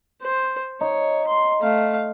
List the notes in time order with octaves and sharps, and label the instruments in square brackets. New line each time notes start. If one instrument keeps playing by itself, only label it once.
[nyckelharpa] C5
[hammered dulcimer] D#4 [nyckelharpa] C#5
[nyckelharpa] C6
A3 F5